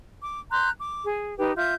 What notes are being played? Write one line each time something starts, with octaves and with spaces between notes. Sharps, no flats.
D6
A#5 C6 F#6 G6
D6
G#4
D#4 G4 B4
F4 E5 G6